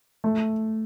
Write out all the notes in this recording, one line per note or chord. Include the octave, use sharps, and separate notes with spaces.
A3